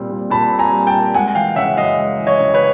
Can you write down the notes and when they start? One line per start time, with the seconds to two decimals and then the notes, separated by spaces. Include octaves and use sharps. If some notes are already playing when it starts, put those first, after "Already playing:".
Already playing: A#2 G3 C4
0.10 A#2
0.30 A#2 A5 B5
0.51 C4
0.59 G#5 A#5
0.73 G3
0.87 G5 A5
0.94 A#2
1.14 G#3 F#5 G#5
1.35 E3 F5 G5
1.56 C#3 E5 F#5
1.77 F#2 D#5 F5
1.99 G#3
2.19 E3
2.27 C#5 D#5
2.40 C#3
2.54 B4 C#5